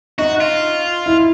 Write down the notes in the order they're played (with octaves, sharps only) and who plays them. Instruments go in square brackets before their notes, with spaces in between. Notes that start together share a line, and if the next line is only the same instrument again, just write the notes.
[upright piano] D#4 [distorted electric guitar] F#4
[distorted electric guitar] F4
[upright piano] E4